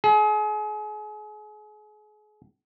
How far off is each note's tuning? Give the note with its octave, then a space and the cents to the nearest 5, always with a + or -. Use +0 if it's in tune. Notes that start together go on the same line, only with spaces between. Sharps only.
G#4 +35